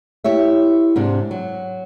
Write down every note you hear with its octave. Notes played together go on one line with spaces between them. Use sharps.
E4 G4 C#5 E5
G#2 C3 D4
F#3